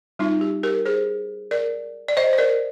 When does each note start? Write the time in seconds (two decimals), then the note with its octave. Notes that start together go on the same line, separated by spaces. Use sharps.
0.19 G3 C4 D#4 F4
0.41 G4
0.63 G4 A#4
0.85 G#4 C5
1.51 A#4 D5
2.08 D5
2.17 C5 D#5
2.33 C5
2.38 A#4 D5